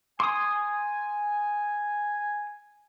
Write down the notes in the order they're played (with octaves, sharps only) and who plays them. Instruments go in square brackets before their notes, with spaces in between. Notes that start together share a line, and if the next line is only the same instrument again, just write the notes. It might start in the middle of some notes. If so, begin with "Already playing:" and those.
[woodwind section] G#5 [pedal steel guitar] C6 D#6